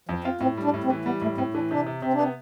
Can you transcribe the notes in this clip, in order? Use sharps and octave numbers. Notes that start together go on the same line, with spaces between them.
F2 F3
C4 F4
A2 C4
G3
D4
A2
C4
E3
G3 B3
A2 A3
A2 C4
E3 D4
C3 D4
C3
C3 C4
D4
B3 C4